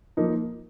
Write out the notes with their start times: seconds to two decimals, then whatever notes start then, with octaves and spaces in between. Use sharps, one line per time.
0.17 F3 A#3 D#4